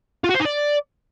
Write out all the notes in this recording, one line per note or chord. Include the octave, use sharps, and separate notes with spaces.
F4
F#4
C5
D#4
D5